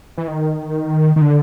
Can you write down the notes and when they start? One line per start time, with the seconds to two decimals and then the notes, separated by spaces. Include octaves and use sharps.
0.18 E3
0.28 D#3
1.16 D#3
1.21 D3